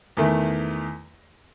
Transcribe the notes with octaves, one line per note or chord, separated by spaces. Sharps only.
E2 D#3 A3